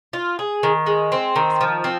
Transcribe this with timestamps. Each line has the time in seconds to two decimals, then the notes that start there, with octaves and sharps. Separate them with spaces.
0.13 F4
0.39 G#4
0.63 D#3
0.86 G#3
1.12 C4
1.36 D#3
1.61 F3
1.84 C4